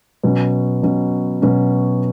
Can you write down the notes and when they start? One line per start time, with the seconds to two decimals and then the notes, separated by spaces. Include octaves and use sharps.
0.23 B2 F#3 C#4
0.83 B2 F#3 C#4
1.42 B2 F#3 C#4